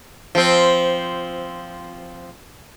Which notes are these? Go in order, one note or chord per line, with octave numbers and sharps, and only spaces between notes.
F3 C4